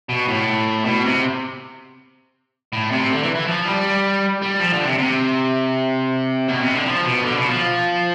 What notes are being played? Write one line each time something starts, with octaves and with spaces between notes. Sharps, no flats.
B2
A2
B2
C3
A2
C3
D3
E3
E3
F3
G3
G3
F3
D3
C3
C3
B2
C3
D3
F3
B2
D3
B2
F3